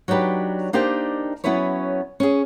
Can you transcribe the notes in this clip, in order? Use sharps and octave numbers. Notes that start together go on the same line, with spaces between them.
F#3 D4 D#4 G4 B4
A#3 D4 D#4 G4 C5 G5
F#3 B3 C#4 E4 B4 C#5
C#4 G#4